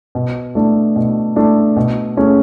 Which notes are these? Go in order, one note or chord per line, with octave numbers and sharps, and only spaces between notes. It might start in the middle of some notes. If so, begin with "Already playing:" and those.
B2
A3 D4
B2
A3 D4
B2
A3 C#4 G#4